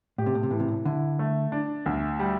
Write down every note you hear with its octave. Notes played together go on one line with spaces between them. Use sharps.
A2 G4
C3
A2
C3
A2 E3
C3
A2
D3 E4
A3
D4
D2
G3